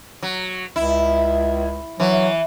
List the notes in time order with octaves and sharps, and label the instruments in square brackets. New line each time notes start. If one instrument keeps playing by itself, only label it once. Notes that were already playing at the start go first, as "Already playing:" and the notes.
[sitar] F#3
[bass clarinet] C#2 [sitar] E4
[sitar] E3 [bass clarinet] F#3